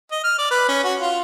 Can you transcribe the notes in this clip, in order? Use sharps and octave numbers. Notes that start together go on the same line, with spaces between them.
D#5
F6
D5
B4
C#4
F#4
F4